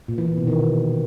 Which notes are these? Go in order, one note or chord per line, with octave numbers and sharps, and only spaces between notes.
A#2
E3
A#2
B2
D#3